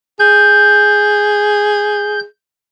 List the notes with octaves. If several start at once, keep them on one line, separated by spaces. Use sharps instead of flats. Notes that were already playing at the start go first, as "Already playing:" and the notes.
G#4 G6